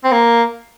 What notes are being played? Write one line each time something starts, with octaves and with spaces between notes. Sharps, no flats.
C4
A#3